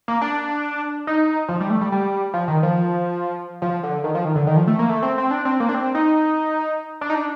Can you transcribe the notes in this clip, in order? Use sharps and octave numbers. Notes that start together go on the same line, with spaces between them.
A#3
D4
D#4
F3
G3
A3
G3
G3
F3
D#3
F3
F3
D3
D#3
F3
D#3
D3
D#3
F3
A3
A#3
A3
C4
C4
D4
C4
A#3
D4
C4
D#4
D4
D#4
D4